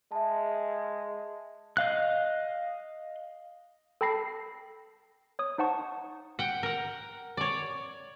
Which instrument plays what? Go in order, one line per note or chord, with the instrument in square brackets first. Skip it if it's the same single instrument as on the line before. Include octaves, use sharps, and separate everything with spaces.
[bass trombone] G#3 [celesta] E5 A5
[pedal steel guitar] D#5 F5 F#6
[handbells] A4 G5 A5 B5 A#6 C7
C#5 D#6
D#4 C5 F#5 A5 C#6
[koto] F#5 G5
A#4 F#5
C#5 D5